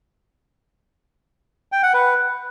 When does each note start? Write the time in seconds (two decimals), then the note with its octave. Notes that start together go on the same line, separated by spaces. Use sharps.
1.72 G5
1.83 F#5
1.94 B4